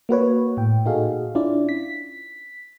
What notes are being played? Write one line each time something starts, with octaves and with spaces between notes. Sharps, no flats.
A#3 F#4 B4 C#5
A2 G5
A#2 D#4 F#4 G#4 A4 F5
C#4 D4 E4 F4 D5
B6